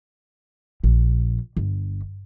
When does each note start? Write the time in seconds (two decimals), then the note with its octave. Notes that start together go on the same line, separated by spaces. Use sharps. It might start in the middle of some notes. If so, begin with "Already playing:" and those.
0.84 A#1
1.57 G1